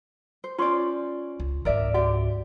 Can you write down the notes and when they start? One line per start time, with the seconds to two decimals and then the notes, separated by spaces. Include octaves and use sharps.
0.44 C5
0.58 C#4 F4 C5 D5 C6 C#6
1.40 C#2
1.65 C#2 G#2 A#4 D5 E5
1.94 F#4 G4 D5 F#5